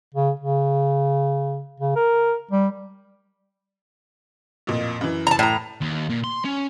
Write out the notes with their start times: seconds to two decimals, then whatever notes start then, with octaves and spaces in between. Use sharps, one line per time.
0.14 C#3
0.39 C#3
1.80 C#3
1.96 A#4
2.51 G3
4.67 A1 F2 A#2
5.01 F#2 E3
5.27 A5 A#5
5.39 A2 A#5
5.81 D#2
6.10 A#2
6.24 C6
6.45 C#4